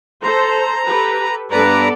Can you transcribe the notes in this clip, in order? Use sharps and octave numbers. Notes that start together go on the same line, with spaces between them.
A4 C5 A#5
G4 A4 B4
G2 B3 A4 B4 D5 A#5